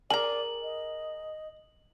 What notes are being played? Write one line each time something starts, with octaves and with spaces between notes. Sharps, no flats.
G#4 A#4 D5 G#5 A#5 F#7
D#5